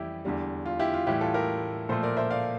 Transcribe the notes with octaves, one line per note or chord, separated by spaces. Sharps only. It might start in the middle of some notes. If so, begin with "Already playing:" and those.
Already playing: F2 E3 G3 E4 G4
E2 D3 G3
F4
E4 G4
F4
A2 E3 G3 E4 G4
F4 A4
G4 A#4
A#2 F3 A3 A4 C5
A#4 D5
C5 E5
D5 F5